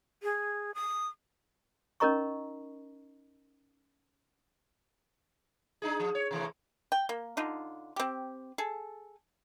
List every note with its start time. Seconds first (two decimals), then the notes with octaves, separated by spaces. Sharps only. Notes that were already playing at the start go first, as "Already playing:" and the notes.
0.23 G#4
0.75 D#6
2.00 C#4 D#4 A#4 D#5 A#5 C#6
5.82 D4 D#4 G#4
6.00 F3
6.15 C#5
6.31 C3 E3 A3
6.92 G5
7.09 A#3
7.37 D3 D#4 F4
7.96 C4 G4
8.58 G#4 A4